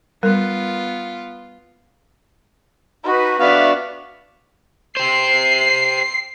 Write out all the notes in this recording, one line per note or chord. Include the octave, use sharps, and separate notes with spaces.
G3 B3 F4 A#4
D#4 F#4 B4
B3 D4 F#4 E5 F5 D6
G4 C5 C7